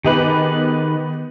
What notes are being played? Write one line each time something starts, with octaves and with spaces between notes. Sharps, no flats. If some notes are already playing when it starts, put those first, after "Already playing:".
D#3 B3 D#4 G4 G#4 B4